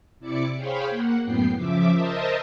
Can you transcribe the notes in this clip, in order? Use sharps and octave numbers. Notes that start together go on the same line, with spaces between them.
C3 E4 D5 D6 C#7
G#4 C5 C#5 F5 G5 B5
A#3 F#5
F#2 A2 B3 G5 C7
C#3 F3 E5 D6
A#4 C5 D#5 E5 A5 D#6